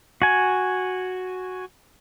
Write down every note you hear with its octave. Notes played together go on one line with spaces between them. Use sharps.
F#4 G#5